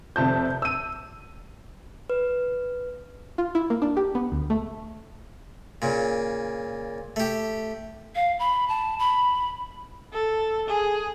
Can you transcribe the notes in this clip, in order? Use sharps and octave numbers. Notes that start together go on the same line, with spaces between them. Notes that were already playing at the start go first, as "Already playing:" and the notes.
F1 C3 A5 G6
E6 D#7
B4
F4
E4
A#3
D4
G4
B3
D2
A3
A#2 C#3
A3 G4
F5
B5
A5
B5
A4
G#4